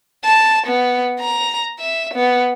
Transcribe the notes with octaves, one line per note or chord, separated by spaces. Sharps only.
A5
B3
A#5
E5
B3